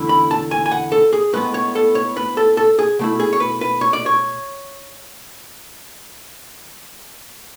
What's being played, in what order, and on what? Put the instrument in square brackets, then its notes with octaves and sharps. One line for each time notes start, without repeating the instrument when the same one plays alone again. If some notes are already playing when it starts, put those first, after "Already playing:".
Already playing: [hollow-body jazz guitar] E2 D3 A3 C#4 E4
B5
A5
G#5
G#5
F#5
A4
G#4
A2 G#3 B3 B4
C#5
A4
C#5
B4
A4
A4
G#4
B2 A3 E4
G#4
C#5
B4
B4
C#5
D5
C#5